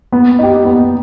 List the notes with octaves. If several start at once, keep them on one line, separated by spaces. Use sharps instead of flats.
B3
D#4 G4
B3